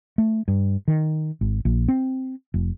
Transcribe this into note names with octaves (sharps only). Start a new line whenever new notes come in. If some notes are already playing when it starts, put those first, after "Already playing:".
A3
G2
D#3
G#1
A#1
C4
F1